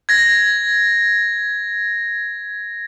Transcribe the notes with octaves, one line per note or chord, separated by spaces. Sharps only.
G#6 A#6